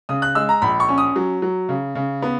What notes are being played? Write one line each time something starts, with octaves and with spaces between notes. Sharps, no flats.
C#3 D#6
F#6
G#3 E6
A#5
A#1 B5
C#6
C#4
D#6
F#3
F#3
C#3
C#3
B3